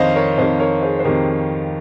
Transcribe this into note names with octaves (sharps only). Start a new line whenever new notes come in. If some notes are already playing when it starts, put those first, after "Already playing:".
Already playing: F2 D#3 C5 C#5 D#5 F5
A#4 C#5
F2 D#3 C5 D#5
A#4 C#5
G#4 C5
C5
F2 D#3 G4 A#4